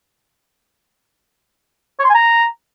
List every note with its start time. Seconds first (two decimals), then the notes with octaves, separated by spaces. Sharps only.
1.99 C#5
2.04 C6
2.09 G#5
2.14 A#5